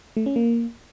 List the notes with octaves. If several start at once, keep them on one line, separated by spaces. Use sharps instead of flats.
A3
C#4
A#3